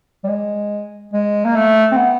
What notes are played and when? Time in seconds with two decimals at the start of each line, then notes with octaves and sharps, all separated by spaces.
0.24 G3
0.28 G#3
1.13 G#3
1.45 A#3
1.56 A3
1.92 C4
1.97 B3